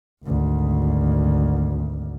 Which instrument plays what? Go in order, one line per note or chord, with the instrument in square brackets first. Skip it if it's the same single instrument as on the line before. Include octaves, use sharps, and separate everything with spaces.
[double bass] G#1 D2